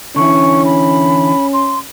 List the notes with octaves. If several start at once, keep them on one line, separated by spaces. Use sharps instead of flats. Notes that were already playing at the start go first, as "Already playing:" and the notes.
D3 E3 C#4 E4 C#6
B5
C6